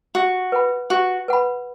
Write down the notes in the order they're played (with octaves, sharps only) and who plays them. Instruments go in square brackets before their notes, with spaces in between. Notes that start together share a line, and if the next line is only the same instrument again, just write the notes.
[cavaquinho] F#4 [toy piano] G4
[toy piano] B4 F#5 B5
[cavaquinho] F#4 [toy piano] G4
[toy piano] B4 F#5 B5